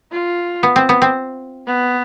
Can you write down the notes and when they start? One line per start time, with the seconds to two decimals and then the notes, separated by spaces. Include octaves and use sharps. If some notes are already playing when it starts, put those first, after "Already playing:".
0.11 F4
0.63 B3
0.76 C4
0.89 B3
1.02 C4
1.67 B3